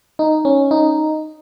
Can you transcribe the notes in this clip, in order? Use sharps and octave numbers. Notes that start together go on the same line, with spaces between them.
D#4
C#4
D#4